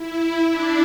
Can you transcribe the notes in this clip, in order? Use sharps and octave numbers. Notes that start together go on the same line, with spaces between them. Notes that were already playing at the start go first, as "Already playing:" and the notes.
Already playing: E4
D4